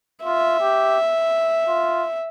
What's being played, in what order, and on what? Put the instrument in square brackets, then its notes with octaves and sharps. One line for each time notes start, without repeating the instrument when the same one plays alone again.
[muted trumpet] F4 [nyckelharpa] E5
[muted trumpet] G4
F4